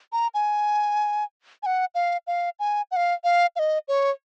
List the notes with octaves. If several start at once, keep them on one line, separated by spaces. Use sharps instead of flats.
A#5
G#5
G#5
F#5
F5
F5
G#5
F#5
F5
F5
F5
D#5
C#5